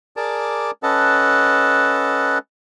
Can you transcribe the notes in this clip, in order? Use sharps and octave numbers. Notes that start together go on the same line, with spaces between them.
G#4 A#4 D5 A5 D6
C#4 A4 B4 D#5 F#5 A5